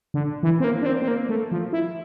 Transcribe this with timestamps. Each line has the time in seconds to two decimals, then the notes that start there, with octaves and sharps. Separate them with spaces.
0.14 D3
0.43 E3
0.60 C4
0.64 A#3
0.82 D4
0.86 C4
1.02 C4
1.08 A#3
1.29 A3
1.52 F3
1.73 E4